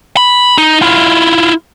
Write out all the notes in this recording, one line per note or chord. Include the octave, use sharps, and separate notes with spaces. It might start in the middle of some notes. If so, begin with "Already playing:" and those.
B5
D#4
E4 F4